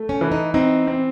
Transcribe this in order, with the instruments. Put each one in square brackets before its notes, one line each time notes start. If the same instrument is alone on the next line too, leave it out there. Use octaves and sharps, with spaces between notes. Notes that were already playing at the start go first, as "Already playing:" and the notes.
Already playing: [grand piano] A3
[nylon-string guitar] C#4
[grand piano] E3
[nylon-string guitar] D#4
[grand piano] C4 [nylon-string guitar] D#4
[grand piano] C4